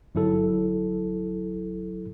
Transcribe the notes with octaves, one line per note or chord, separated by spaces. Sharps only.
G1 F#3 E4 A4